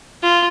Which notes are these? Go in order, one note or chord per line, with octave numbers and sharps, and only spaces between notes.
F4